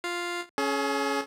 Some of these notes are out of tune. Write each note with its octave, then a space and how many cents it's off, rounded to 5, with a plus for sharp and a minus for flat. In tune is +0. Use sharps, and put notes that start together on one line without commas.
F4 +0 F5 +0
C#4 +0 G#4 +40